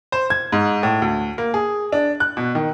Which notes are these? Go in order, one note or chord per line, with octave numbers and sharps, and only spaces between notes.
C5
G#6
G#2
A2
D2
A#3
G#4
D4
F#6
B2
D#3